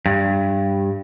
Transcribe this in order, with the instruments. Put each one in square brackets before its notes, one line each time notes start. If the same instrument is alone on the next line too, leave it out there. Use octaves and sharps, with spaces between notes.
[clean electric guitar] G2